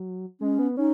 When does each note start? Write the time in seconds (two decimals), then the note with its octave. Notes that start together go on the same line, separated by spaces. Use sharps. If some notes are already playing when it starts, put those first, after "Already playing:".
Already playing: F#3
0.41 G#3 C#4
0.59 B3
0.77 C#4 D#4